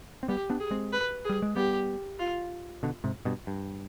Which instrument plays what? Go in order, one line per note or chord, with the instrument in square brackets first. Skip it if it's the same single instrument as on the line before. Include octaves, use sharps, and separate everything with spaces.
[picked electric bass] C4
[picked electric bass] G3 B3 [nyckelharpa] G4
[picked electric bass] B3 D4
[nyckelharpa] G#4
[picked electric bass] G#3 C4
[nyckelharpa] B4
G#4
[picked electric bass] G3
G#3
[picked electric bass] G3 B3 [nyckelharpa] G4
[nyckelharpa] F4
[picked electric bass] B2 D3
G#2 C3
G2 B2
G2